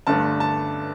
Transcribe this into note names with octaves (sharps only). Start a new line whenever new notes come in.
G1 G2 D3 A3 D4 A5
A5